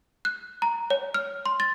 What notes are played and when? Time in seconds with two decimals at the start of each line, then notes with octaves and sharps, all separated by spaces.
0.25 F#6
0.62 A#5
0.90 C#5
1.14 F6
1.46 C6
1.60 A6